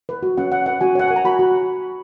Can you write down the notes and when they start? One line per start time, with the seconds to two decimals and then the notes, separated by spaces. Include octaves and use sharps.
0.09 B4
0.23 F#4
0.37 C#4 F#5
0.52 C#4 F#5
0.66 B4 F#5
0.81 F#4 G#5
0.95 C#5 F#5
1.08 A#4 G#5
1.16 A#5
1.25 F#4 B5
1.39 F#4